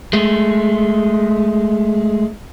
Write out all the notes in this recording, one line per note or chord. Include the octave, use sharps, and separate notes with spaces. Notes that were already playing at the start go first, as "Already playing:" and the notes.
G#3 A3